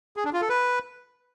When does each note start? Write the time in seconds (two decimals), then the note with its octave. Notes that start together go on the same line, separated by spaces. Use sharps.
0.17 G#4
0.25 D4
0.33 F4
0.41 A4
0.49 B4